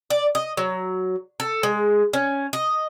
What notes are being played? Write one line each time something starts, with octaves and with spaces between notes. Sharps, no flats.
D5
D#5
F#3
A4
G#3
C#4
D#5